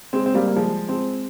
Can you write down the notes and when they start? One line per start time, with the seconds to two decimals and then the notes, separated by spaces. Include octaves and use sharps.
0.13 G#3 C4
0.26 C4
0.34 G3 A#3
0.48 A#3
0.56 F3 G#3
0.89 G#3 C4